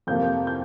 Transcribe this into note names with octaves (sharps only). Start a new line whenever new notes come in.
F2 C3 F3 A#3 G6
G6